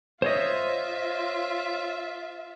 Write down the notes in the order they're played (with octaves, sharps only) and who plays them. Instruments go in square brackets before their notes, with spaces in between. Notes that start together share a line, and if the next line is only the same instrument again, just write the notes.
[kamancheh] F4 E5 [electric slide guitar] C5 C#5 D#5